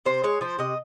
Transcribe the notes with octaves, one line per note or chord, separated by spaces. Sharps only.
C3 C5
G#3 C#5
F3 C5
C3 D#5